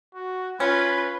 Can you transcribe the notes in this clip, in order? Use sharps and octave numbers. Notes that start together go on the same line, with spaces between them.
F#4
C#4 F4 B4 B5